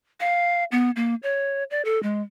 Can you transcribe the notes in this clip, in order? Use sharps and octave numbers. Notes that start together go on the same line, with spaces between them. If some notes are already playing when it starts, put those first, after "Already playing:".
F5
B3
A#3
C#5
D5
A4
G#3